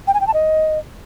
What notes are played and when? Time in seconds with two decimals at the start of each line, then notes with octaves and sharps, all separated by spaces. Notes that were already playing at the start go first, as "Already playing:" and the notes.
0.07 G5
0.14 G#5
0.21 G5
0.27 A5
0.34 D#5